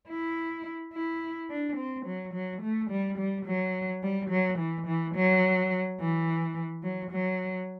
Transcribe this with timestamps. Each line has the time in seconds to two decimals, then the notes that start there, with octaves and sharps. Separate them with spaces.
0.08 E4
0.93 E4
1.50 D4
1.77 C4
2.06 F#3
2.34 F#3
2.62 A3
2.90 G3
3.18 G3
3.46 F#3
4.03 G3
4.30 F#3
4.58 E3
4.87 E3
5.15 F#3
6.00 E3
6.83 F#3
7.11 F#3